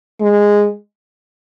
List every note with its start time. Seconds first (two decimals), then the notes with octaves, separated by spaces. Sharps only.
0.21 G#3